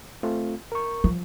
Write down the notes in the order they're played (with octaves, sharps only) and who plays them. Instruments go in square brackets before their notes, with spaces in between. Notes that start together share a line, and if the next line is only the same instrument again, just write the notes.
[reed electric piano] A3 C4 F4
A#4 C#6
[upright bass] F3